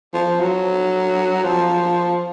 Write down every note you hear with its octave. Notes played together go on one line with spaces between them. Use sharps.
F3
F#3
F3